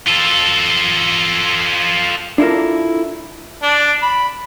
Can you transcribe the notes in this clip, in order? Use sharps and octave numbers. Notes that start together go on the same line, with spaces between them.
F4 A4
D4 E4 F4 A4 A#4
D4
B5